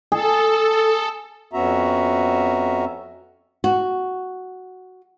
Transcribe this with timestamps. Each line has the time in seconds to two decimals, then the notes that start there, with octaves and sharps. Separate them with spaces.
0.12 G#4 A4
1.53 F2 B3 C#4 F#4 E5 A#5
3.64 F#4